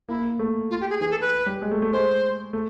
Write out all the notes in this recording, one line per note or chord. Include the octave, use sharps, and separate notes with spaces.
A#3 E4
A#3
A3
F4
G4
G#4
E3 G#4
A4
B4
G3
G#3
A3
A3
G#3 C5
A3